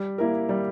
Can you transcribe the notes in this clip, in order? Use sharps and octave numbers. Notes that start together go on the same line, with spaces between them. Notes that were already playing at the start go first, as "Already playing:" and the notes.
Already playing: G3
A#3 E4 A#4
G3